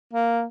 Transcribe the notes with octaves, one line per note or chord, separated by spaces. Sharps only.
A#3